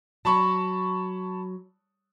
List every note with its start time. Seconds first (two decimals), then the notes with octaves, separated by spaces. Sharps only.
0.25 F#3 A5 B5 C#6